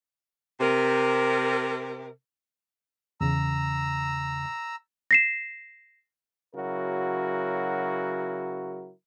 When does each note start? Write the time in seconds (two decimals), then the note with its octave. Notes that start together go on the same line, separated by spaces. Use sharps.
0.61 C3 A#4
3.21 E2 C#3 A#5 E6
5.11 A#6 C7 E7
6.55 C#3 F#3 E4 F#4 A#4